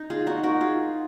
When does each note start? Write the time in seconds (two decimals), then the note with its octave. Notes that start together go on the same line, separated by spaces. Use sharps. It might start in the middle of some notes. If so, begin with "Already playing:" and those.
Already playing: D#4
0.10 F4 G#4
0.27 D#4 F#4
0.43 F#4 A#4
0.61 F4 G#4